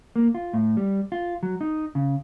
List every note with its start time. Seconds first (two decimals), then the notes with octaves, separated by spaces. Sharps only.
0.16 A#3
0.35 F4
0.54 A2
0.77 G3
1.12 F4
1.43 F#3
1.61 D#4
1.95 C#3